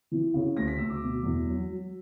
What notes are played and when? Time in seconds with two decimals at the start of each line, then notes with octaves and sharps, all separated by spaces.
0.11 E3
0.34 C#3
0.56 D2 A#6
0.68 B6
0.78 D2 E6
0.90 D6
1.01 B2
1.23 E2
1.45 F#3
1.68 F#3